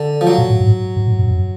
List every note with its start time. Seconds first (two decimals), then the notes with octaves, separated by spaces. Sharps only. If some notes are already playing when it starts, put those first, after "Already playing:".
Already playing: D3
0.21 F3
0.27 F#3
0.38 A#2
0.50 A2
0.60 G#2
0.96 G#2
1.08 A2
1.19 G2
1.31 F#2